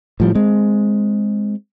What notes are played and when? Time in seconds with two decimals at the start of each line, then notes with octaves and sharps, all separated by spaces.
0.20 A2 F3 G3
0.35 G#3 C4